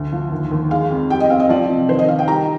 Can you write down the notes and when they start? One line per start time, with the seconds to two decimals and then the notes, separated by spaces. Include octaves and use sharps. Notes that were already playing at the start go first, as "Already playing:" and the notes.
Already playing: D2
0.12 F3
0.32 D#2
0.51 D#2
0.71 G#3 F5
0.91 F2
1.10 G3 G5
1.20 D#5
1.30 C4 F5
1.40 D#5
1.49 F3 D5
1.70 C3
1.89 D#3 C5
1.99 D#5
2.08 D#3 F5
2.19 G5
2.28 G3 A#5